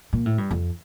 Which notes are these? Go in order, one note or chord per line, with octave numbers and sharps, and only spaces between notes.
A#2
A2
G2
F2